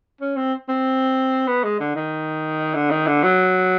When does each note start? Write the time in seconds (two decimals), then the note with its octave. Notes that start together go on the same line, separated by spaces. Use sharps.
0.21 C#4
0.37 C4
0.68 C4
1.48 B3
1.64 G#3
1.80 D3
1.95 D#3
2.75 D3
2.90 D#3
3.07 D3
3.23 F#3